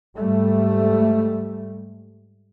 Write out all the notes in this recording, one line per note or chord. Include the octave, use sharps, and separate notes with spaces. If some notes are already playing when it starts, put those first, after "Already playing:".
G#2 G3 A3